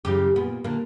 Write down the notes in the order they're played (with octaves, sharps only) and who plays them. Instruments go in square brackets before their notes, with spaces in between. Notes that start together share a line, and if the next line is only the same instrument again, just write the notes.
[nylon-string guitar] F#2 C#3 E3 [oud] G4
[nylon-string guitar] A#2 [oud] B3
[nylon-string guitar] A#2 D3 [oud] A#3